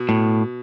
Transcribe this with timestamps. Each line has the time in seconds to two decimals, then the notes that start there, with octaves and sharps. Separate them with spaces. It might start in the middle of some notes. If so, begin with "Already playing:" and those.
Already playing: B2
0.09 A2